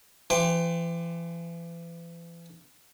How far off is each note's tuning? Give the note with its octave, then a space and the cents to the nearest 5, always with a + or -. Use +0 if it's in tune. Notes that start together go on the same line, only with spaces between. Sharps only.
E3 +40 G5 +20 C6 +0